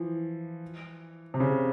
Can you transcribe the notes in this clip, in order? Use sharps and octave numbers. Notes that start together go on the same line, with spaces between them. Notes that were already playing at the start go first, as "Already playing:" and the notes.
Already playing: E3 F3
C3
C#3